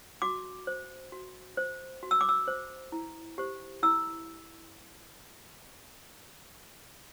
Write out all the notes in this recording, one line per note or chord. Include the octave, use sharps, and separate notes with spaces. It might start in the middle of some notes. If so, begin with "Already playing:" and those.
F#4 D6
C5
F#4
C5
F#4
E6
D6
E6
C5
E4
G4 C5
E4 E6